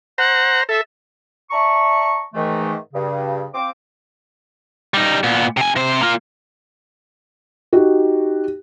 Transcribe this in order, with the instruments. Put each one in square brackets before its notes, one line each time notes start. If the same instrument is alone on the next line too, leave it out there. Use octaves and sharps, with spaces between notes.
[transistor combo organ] C5 A#5 [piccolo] F#5
[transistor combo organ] A4 [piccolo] E5
[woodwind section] D5 E5 A5 A#5 C#6
G#2 D#3 E3 A3
G2 C#3
C4 F4 D6
[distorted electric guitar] G3 D#4
A#2 B3
C3 G#5
C3 C5
A#3 F4
[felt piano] D#4 F#4 G4